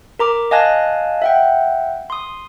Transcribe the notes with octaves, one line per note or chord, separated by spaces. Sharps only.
A#4 A#5 D6
D#5 F5 G#5 A5 F#6 A#6
E5 F#5 G5
C6 D#6